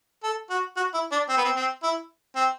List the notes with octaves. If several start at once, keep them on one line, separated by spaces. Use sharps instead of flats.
A4
F#4
F#4
E4
D4
C4
B3
C4
C4
E4
C4